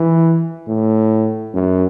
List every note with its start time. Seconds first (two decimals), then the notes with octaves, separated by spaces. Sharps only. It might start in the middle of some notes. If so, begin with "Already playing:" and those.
Already playing: E3
0.68 A2
1.54 F#2